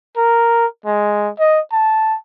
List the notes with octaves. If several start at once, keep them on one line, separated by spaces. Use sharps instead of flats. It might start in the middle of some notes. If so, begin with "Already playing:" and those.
A#4
G#3
D#5
A5